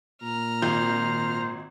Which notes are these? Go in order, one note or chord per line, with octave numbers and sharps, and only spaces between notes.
A#2 A#5 F6
G#1 F4 C5 G6